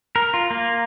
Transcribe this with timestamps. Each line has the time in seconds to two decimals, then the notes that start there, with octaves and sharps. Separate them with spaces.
0.16 A#4
0.34 F4
0.51 A#3